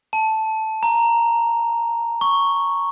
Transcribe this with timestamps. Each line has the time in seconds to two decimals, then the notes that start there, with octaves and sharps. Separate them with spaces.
0.13 A5
0.83 A#5
2.21 C#6